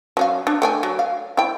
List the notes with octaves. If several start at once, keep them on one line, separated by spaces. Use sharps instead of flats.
F#3 C#4 F5
D4
A3 G5 G#5
F#3
F5
E4 G5